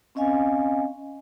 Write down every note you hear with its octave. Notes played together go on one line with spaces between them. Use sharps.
C4 C#4 D#5 F5 G#5